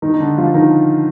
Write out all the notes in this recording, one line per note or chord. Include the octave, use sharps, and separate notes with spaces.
D#3 D#4
D#4
D3 D4
F3 F4
D#3 D#4